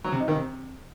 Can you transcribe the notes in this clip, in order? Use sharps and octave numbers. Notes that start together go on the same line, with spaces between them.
F#3
C3
D#4
D#3
C3